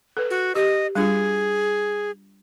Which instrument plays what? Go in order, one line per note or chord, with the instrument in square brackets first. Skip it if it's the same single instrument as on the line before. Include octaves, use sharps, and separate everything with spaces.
[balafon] A4 B4
[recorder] F#4
[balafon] G4 [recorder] D#5
[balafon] G3 D4 F4 [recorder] G#4